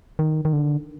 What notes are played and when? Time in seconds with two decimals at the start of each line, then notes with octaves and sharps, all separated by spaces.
0.19 D#3
0.45 D#3
0.53 D3